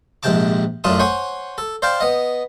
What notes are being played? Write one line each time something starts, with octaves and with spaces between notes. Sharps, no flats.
A#1 G#2 C3 G5 A5 D6
F#2 A2 D4 F4 A5 D#6
C5 C#5 F#5 G#5
A4
C5 D5 F5 G5 A5
B3 D#5